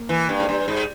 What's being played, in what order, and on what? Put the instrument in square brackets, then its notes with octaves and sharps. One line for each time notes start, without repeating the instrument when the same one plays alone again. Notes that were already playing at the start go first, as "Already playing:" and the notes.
Already playing: [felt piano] A#3
[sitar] E3
G2
G#2
G2
G#2